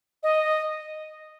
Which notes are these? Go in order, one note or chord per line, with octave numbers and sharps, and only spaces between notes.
D#5